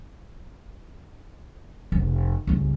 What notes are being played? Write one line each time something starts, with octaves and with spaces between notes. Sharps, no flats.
F1
G1 C#2